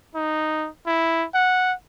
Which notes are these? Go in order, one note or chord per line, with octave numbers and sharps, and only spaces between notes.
D#4
E4
F#5